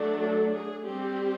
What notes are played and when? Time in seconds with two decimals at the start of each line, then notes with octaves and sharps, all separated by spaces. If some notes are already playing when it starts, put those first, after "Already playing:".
Already playing: F#3 A3 D4
0.23 A4
0.53 G#4
0.84 G3 C4 G4